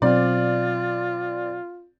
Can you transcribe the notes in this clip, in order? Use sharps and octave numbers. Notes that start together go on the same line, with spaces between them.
B2 F#3 C4 F4 D5